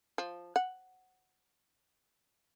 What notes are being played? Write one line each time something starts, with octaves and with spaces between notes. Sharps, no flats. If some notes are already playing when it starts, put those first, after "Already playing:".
F3
F#5